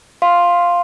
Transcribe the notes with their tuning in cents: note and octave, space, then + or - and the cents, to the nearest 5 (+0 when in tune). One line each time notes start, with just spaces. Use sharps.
F5 +0 C6 +5